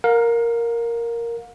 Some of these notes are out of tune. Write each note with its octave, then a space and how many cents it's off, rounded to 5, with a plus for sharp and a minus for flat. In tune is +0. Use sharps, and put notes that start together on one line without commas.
A#4 +0 F5 +35